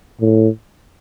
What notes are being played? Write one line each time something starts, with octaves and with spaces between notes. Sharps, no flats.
A2